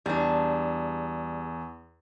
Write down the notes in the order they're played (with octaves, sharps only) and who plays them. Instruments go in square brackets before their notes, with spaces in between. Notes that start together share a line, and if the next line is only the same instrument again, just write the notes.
[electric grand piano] E2 [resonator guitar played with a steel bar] G3 D4